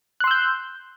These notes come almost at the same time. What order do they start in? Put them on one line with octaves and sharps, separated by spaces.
F#6 C6 E6 G6